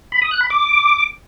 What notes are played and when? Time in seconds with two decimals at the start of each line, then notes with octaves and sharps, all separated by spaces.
0.12 B5
0.22 D#6
0.31 F#6
0.41 B5
0.50 D6